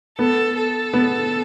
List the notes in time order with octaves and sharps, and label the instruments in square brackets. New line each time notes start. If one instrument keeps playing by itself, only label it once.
[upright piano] B3 [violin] A4
[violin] A4
[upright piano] B3